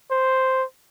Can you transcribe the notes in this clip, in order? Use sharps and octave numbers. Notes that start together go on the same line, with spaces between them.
C5